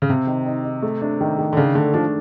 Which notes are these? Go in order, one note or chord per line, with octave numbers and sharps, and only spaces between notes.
C#3
C3 C4
D#3
D#4
D#4
A3
D4
D#3
D#3
D3
C#3 D4
D3 A3
F3 D4